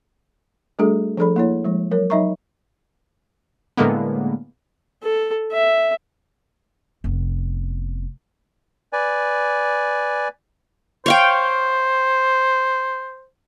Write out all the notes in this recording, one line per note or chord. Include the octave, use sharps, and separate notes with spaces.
G3 A3 D4 F#4 G#4 A4
F3 D4 G#4 A4 D5 B5
A#3 E4 C#5
F3 G#3
F#3 A#4 C#5
F#3 D#4 D#5 E5 A#5 C#6
A2 D3 G#3 A#3 B3
A4
E5
F1 B3
B4 D5 G#5
C5 C#5 F5 G5